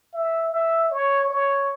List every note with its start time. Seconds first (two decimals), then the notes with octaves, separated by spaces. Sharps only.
0.14 E5
0.52 E5
0.91 C#5
1.30 C#5